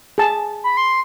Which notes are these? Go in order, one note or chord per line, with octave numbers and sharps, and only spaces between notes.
G#4 A5
B5
C6